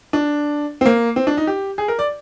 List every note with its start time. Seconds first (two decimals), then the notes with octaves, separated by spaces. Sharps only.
0.13 D4
0.81 C4
0.86 A#3
1.16 C4
1.27 D4
1.37 D#4
1.47 G4
1.78 G#4
1.88 A#4
1.99 D5